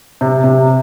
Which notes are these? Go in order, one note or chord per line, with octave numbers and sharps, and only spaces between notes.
C3
C3